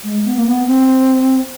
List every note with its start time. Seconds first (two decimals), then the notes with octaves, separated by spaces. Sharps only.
0.04 G#3
0.25 B3
0.36 A#3
0.46 B3
0.67 C4